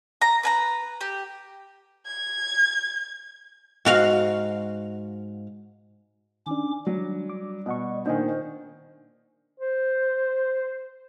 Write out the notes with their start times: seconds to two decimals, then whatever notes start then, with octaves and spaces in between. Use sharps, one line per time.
0.21 A#5
0.43 B4 G#5 A#5
1.01 G4
2.06 G#6
3.85 G#2 F#4 F5
6.46 D#3 C#4 D4 D6
6.87 F#3 G3
7.30 D6
7.66 B2 D#5 F#5 C#6
8.06 A#2 D#3 D4 C5 D#5 G#5
9.60 C5